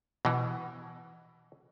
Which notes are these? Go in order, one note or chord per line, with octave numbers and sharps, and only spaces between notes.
B2 E3